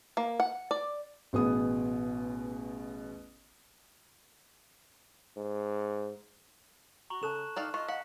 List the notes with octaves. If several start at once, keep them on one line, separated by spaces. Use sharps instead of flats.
A#3
F#5
D5
A1 B2 B3 G#4 D#6
G#2
F#4 A#5 C#6 F#7
C#3 A4 A5 F#6 E7
E7
D#3 D#4 D5 F5
F4 D#5 C#6
F5 F#5